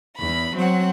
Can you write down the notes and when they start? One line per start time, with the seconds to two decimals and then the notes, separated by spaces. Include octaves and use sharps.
0.17 E2 B5
0.54 F#3 C4 F#5